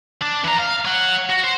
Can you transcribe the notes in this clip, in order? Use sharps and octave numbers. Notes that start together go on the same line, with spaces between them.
D4
E3 A#5
F5
C#5 F#5
F#4
C5